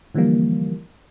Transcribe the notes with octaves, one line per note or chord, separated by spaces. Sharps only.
D3 E3 F3 G3 A#3